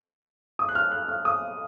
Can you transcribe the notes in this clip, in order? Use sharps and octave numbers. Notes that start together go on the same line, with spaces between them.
D#6
F#6
F6
F#6
F6
D#6